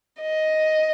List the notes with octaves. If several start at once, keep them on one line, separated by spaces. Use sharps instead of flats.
D#5